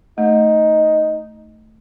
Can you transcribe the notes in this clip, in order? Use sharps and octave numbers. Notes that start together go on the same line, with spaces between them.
A3 D#4